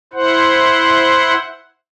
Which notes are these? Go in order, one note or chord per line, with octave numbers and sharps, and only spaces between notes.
E4 C5 F#5